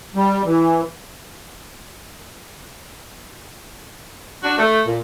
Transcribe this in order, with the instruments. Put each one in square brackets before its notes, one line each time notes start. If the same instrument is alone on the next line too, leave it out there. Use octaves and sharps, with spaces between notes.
[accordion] G3
E3
[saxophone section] D4 F#4
A3
A#2